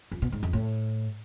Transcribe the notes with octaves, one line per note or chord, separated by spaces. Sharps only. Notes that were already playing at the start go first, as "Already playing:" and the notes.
F2
B2
G#2
F2
A2